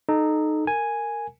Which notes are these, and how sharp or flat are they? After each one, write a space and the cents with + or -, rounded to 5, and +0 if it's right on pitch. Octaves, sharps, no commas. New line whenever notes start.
D#4 -15 A4 -25
A#4 -15 G#5 +0